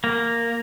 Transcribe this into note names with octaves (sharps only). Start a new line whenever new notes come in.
A#3